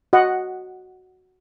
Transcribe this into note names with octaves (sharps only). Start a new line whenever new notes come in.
F#4 D#5 F#5